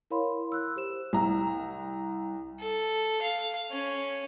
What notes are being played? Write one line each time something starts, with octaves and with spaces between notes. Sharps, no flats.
E4 A#4 C#5 F5 B5 C6
E6 F#6
G4 C5 E7
C2 A#5
A4
F5
C#4